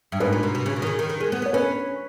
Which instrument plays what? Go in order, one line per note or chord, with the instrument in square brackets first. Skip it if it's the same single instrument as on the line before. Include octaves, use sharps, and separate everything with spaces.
[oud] G2
[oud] G#2 [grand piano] B4
[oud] A#2
B2
B2
C#3
B2
D#3
C#3
D#3
D#3
G#3
B3
[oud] B3 [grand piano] C#5
[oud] C#4 [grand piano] B4